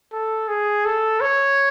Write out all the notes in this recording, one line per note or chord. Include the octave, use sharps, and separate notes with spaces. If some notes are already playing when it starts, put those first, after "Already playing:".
A4
G#4
A4
C#5